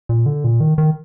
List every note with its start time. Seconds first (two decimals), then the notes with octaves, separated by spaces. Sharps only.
0.09 A#2
0.26 D3
0.44 A#2
0.60 D#3
0.78 D#3